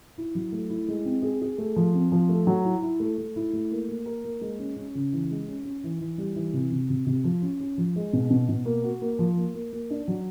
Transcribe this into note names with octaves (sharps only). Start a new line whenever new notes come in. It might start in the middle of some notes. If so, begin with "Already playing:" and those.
E4
F#3
A3
E4
G#3
C4
G#4
G#4
A3
F3
C4
F3
A3
F#3
E4
E4
A3
A3
E4
A3
A#3
A#3
A#4
A#3
G#3
C#4
C#4
C#3
E3
G#3
C#4
C#4
E3
E3
G3
E3
C3
C3
C3
C3
F3
C#4
C#4
F3
G#3
B2
B2
B2
A#3
F#4
A#3
F3
A#3
A#3
A#3
D4
F#3